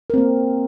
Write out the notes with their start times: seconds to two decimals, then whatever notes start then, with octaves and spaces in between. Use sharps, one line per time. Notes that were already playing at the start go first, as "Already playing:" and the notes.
0.10 A#4
0.14 C4
0.18 A#3